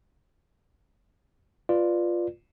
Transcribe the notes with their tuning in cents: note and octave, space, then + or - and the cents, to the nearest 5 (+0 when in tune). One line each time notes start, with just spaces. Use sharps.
F4 -5 B4 +0 D5 +10